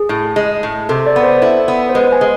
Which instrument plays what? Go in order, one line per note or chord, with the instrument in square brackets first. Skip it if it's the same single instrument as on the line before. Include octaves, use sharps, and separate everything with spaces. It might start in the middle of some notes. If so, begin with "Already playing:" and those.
Already playing: [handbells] G#4
[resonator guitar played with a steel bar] A2
G#3
A2
[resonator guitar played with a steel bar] C3 [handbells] A4
[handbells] D5
[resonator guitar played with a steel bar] B3
[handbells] C5
[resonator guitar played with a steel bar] E4 [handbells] A4
[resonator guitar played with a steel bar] B3
[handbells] C5
[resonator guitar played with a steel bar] G#3 [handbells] B4
[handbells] G#5
[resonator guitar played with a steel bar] G#3